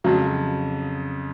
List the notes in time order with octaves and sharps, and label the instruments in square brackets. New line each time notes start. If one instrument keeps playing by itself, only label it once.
[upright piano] F2 C#3 F#3 [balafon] F#4